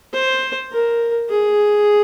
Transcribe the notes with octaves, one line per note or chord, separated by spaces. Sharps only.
C5
A#4
G#4